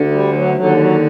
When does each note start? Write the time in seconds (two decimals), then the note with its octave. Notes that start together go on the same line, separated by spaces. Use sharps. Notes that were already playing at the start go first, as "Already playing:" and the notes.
Already playing: D2 D3
0.11 G3
0.33 F#3
0.55 D#2 D3 F#3
0.77 F#3